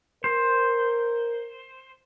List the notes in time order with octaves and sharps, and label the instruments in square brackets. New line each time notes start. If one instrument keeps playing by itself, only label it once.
[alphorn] A#4 [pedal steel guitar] C5